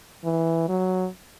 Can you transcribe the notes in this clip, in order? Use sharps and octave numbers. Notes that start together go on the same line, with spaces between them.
E3
F#3